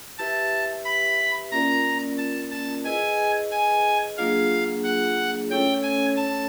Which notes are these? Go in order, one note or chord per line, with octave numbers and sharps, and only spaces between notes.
E4 G4 B4 E5 A5
B5
A#3 C#4 F4 A#4 D5 A#5
A5
A5
E4 G#4 B4 D#5 G#5
G#5
F#3 A#3 D4 F4 G#4 F5
F#5
A3 C#4 E4 A4 C#5 G5
G#5
A5